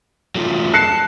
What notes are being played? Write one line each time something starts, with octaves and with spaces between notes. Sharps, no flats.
F#3 A3 F4
A5 F#6 C7 C#7